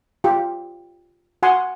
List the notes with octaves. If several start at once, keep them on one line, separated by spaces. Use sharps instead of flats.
F4 G4
F#4 F#5 G#5 C6